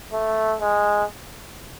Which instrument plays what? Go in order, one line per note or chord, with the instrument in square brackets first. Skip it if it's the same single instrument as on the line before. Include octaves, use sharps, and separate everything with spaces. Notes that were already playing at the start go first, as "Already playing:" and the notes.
[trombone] A3
G#3